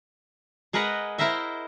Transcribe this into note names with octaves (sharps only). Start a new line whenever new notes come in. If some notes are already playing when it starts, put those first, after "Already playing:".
G#3 G#4 A#4 B4 D#5 F#5
E4 A#4 C5 D#5 E5